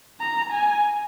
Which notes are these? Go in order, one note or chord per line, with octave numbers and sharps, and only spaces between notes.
A#5
G#5